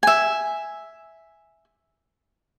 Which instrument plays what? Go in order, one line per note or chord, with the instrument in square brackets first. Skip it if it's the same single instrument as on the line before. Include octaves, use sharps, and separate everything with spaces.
[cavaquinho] E5 G#5